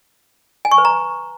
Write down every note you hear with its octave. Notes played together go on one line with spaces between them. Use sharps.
G#5
C#6
B4
A#5